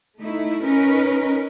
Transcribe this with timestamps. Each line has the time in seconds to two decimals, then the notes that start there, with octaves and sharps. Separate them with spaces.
0.19 A3 D#4 E4
0.61 C#4 D#4 A#4 B4